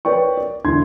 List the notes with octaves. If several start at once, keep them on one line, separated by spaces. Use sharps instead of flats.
A#4 B4 C#5 D5 G5 C#6
D5
E1 D3 E4 C6 G#6